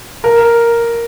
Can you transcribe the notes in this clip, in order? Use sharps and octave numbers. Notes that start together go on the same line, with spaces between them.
A#4